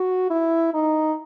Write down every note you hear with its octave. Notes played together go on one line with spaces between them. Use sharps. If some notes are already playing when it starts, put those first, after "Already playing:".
Already playing: F#4
E4
D#4